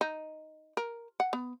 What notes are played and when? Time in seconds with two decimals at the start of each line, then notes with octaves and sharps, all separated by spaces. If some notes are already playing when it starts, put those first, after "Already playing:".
0.01 D#4
0.77 A#4
1.20 F#5
1.33 B3